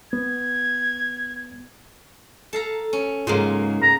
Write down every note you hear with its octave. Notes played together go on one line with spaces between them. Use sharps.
B3 G#6
A4 F5 A#5
C#4
G#2 C#3 F#3 A#3 F4
A#5